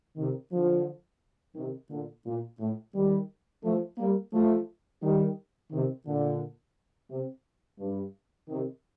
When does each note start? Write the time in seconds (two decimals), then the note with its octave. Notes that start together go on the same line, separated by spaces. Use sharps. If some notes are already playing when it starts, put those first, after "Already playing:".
0.17 C3 D#3
0.52 D3 F3
1.55 C3 D#3
1.90 A#2 D3
2.26 A#2
2.60 A2
2.95 D#3 G3
3.64 F3 A3
3.98 G3 A#3
4.33 F3 A3
5.02 D#3 G3
5.71 C3 D#3
6.06 A#2 D3
7.11 C3
7.79 G2
8.49 C3 D#3